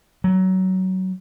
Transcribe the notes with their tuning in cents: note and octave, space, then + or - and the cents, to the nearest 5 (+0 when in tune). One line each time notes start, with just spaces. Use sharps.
F#3 +20